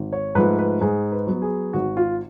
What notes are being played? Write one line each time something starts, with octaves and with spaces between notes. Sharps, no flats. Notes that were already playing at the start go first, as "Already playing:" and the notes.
Already playing: G#1
C#5
G#2 F3 A3 B4
B4
G#2 G#4
B4
F#3 B3
G#4
G#1 F#4
F4